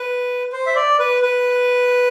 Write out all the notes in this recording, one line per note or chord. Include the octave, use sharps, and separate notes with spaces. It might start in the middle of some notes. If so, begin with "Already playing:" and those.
Already playing: B4
C5
E5
D5
B4
B4